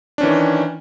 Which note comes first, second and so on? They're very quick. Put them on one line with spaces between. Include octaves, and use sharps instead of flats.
D4 C#4 E3 D#3